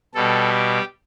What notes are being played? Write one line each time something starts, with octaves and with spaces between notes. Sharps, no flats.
B2 G3 A4
G4